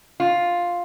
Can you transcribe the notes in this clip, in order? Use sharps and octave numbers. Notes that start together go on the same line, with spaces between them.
F4